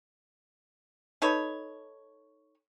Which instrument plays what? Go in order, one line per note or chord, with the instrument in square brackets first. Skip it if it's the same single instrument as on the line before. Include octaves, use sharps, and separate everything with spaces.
[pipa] D#4 A4 B4 C#5